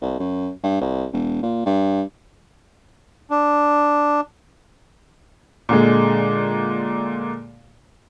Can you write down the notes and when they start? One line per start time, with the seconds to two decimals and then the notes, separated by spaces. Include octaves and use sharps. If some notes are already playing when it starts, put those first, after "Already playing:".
0.02 C2
0.20 F#2
0.63 G2
0.81 C2
1.12 E1
1.43 A#2
1.66 G2
3.30 D4
5.69 A#2 D3 G#3